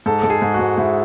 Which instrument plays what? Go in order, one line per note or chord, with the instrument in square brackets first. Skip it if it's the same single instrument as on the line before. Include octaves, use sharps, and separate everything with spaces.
[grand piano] G#2 A4
G#2 A4
G#4
G#2
F#4
G#2
G#2 E4